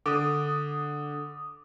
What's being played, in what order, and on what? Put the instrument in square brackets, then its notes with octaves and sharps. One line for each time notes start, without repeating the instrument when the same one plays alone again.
[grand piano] D3 [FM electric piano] D6 D#6